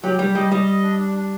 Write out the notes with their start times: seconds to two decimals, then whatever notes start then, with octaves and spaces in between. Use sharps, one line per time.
0.03 F#3 G4
0.19 G3 G4
0.35 G3 D#5
0.51 G3 D#5
0.67 D#5
0.83 D4
0.99 D4
1.16 D4